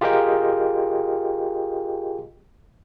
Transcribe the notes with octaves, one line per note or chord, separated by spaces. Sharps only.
F4 G4 G#4 A#4 D#5 G5